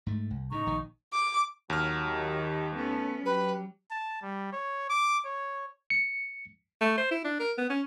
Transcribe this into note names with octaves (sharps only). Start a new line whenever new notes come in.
G#2 A3
C2
A2 C#3 D#4 A#5 C#6
A#1 D#3
D6
D#2 F#3 F6
D#3 G4
A3 B3 C#4
F#3 G4 B4
A5
G3
C#5
D6
C#5
C#7
A3
C5
E4
D4
A#4
B3
C#4